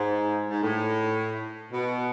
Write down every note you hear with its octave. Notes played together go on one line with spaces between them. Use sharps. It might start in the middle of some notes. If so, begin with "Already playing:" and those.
Already playing: G#2
G#2
A2
B2